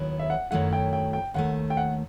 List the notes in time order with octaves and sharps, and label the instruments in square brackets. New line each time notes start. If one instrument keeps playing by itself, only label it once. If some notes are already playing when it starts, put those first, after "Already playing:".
Already playing: [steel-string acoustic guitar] D#2 D#3 F#3 B3 E4
[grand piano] E5
F#5
[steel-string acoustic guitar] F#2 D#3 F#3 A3 E4 [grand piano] F#5
[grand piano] G5
G5
G5
[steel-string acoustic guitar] D#2 D#3 A3 [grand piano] F#5
[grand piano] G5
F#5